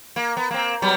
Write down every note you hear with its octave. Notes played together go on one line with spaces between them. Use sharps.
A#3
B3
A#3 C4
F#3 G3 B3